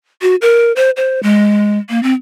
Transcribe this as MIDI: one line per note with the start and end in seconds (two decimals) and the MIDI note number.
0.22 0.35 66
0.42 0.72 70
0.76 0.90 72
0.97 1.22 72
1.23 1.79 56
1.90 2.02 58
2.03 2.13 60